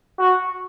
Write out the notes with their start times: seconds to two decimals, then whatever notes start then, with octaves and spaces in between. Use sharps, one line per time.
0.19 F#4